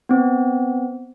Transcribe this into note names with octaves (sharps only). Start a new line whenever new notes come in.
B3 C4